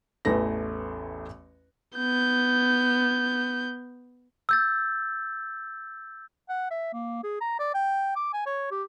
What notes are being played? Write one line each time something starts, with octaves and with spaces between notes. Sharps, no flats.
A1 E2 A3 A#6
B3 G6
E6 G6 A6
F#5
E5
A#3
G#4
A#5
D5
G5
D6
G#5
C#5
G4